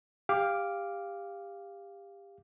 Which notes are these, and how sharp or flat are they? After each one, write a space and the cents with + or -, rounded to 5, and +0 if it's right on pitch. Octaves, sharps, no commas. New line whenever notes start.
G4 +25 F5 +0 D6 +0